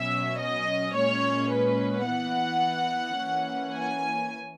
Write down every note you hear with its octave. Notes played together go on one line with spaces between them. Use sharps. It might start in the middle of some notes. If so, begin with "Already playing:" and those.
Already playing: B2 F#3 C#4 E5
D#5
A#2 G#3 C#4 C#5
B4
E3 B3 F#5
E3 A#3 C#4
G#5